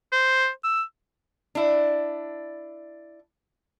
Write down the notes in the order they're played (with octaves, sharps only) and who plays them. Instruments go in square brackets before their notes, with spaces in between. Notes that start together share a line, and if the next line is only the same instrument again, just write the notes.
[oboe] C5
E6
[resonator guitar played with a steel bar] D4 E4